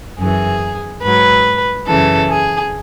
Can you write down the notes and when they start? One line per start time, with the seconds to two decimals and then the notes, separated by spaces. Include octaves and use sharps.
0.18 F#2 E3 G#4
1.02 G#2 F#3 B4
1.86 F#2 C#3 E3 A4
2.29 G#4